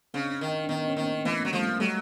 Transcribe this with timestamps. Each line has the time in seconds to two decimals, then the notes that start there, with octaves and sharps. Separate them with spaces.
0.14 C#3 C4 D4
0.41 D#3
0.64 D4
0.69 D#3 B3 C#4
0.89 C#4
0.96 D#3 A#3 C4
1.25 E3 A3 B3
1.45 F#3
1.53 F3 G3 A3
1.68 A#3
1.80 F#3 G3 A3